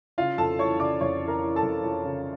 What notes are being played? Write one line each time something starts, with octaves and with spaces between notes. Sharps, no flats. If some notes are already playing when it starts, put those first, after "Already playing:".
C#3 F4 F5
F2 A4 A5
E3 C#5 C#6
C#3 D5 D6
F2 C#5 C#6
E3
A#4 A#5
E3
A4 A5
F2
F2
C#3